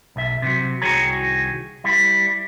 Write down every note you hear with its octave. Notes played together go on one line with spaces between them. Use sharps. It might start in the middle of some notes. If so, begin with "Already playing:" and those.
B1 E5
C3 E3 F#3
C2 D#3 F#4 G#4 C#5 A#5
G3 E4